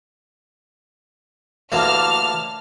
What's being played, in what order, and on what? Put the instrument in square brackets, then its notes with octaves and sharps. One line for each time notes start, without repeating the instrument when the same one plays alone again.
[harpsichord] A1 D2 A#3 [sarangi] A5 [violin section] F6